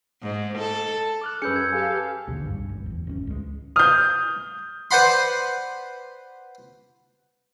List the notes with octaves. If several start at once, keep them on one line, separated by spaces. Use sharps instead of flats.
G#2
A4
D6 F6 F#6
F#2 C#4 G#4 B4 E6 G6 C#7
G#6 C#7
G4 A4 F5 G#5
A1 D#2 B2 D3
C2 G2
G#1
D1 E2
G1 A2 C4 C#4
C#2 G#3
D#6 F6 G6
B4 C5 D5 F#5 B5 C6